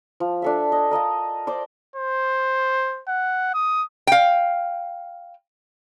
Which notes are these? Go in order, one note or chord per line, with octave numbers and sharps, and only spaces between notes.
F3
D4 A4 E5
D#5 G#5
A#4 D#5 F5 A5
C5 D5 D6
C5
F#5
D#6
F5 G5